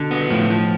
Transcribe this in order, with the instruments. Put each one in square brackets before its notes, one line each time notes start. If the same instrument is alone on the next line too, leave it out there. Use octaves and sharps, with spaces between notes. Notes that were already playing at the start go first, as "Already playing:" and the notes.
Already playing: [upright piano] B2 [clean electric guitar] D3
[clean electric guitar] B3
[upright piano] A2 [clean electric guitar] F3
[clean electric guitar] F3